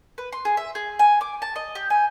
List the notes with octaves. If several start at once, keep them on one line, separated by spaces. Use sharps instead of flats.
B4
C6
G#4
E5
G#4
G#5
D6
A5
D#5
G4
G#5